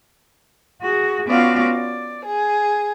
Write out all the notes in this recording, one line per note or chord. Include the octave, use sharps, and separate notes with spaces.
F#4 G#4
B3 C#4 F4 F#4 D5 F5
D5
G#4